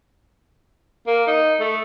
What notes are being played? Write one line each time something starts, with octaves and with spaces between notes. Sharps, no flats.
A#3
D#4
A3